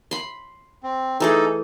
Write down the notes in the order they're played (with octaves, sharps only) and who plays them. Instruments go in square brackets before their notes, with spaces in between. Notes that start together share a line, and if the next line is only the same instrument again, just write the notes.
[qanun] B5 C6
[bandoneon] C4
[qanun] E3 A3 G#4 [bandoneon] D#4 A4